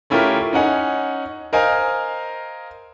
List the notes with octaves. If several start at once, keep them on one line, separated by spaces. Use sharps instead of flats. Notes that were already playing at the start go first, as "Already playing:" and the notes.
A3 C#4 E4 F4 G4 A#4
C#4 D#4 F#5 G#5
A#4 C5 D#5 F5 G#5